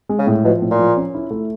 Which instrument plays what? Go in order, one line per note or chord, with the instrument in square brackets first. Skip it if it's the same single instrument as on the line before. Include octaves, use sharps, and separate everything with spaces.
[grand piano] G#3
[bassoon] C#3
[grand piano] A2
[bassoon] B2 [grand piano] F3
[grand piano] A2
[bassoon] A#2
[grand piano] F3
C#4
E4
A3